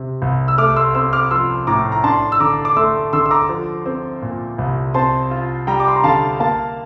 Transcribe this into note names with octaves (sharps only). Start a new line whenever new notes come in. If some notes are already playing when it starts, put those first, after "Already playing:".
Already playing: C3
C2
E6
A3 D6 F6
C6 E6
C4 C6 E6
D6 F6
F3 C6 E6
A2 A#5 D6
A#5
D4 A5 C6
E6
D3 A#5 D6
D6
A3 C6 E6
D3 C6 E6
E6
A#5 D6
F3
C4
A#2
C2
C4 A5 C6
F4
G3 G5 A#5
D6
C6
A#5
D3 F5 A5
A#3 F5 A5